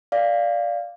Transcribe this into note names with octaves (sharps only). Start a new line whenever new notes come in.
D5 F5